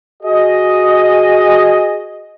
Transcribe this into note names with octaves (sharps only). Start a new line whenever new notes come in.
F#4 G#4 D#5